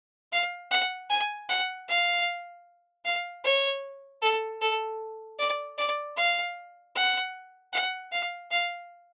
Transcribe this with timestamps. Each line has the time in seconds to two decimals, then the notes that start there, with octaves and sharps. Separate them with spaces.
0.32 F5
0.71 F#5
1.10 G#5
1.49 F#5
1.88 F5
3.05 F5
3.44 C#5
4.22 A4
4.61 A4
5.39 D5
5.78 D5
6.17 F5
6.95 F#5
7.73 F#5
8.12 F5
8.51 F5